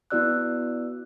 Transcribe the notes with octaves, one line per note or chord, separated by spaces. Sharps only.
B3 E4 F#4 D5 E6 F#6